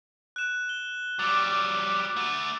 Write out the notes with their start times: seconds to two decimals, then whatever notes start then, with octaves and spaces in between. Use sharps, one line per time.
0.36 F#6 E7
0.69 G7
1.19 F#3 G3 D6 A6
2.17 A3 F#4